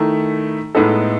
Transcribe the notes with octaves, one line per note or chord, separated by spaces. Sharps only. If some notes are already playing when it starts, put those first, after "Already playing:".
Already playing: D#3 A3 E4
A2 G#3 B3 D#4 A4